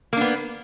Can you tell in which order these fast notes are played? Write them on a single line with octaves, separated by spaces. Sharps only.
A#3 D4 B3